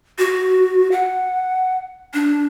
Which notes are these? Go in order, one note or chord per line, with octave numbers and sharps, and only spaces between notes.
F#4
F#5
D4